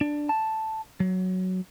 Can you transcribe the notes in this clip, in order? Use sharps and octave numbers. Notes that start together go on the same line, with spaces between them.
D4
A5
F#3